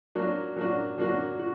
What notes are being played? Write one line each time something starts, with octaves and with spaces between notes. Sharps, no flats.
F#3 A#3 D4 F#4
F#3 A#3 D4 F#4
F#3 A#3 D4 F#4
F#4